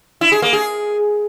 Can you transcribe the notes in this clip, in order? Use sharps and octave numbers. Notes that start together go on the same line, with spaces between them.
E4
G#4
A#3
G#4